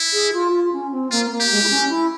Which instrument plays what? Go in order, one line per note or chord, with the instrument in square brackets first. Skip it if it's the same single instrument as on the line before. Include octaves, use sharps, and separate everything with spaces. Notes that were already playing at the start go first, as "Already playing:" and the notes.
Already playing: [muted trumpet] E4
[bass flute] G#4
F4
F4
C#4
C4
[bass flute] A#3 [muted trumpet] F4
[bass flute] A#3
[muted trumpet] G4
[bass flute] G#3
E4
C#4
E4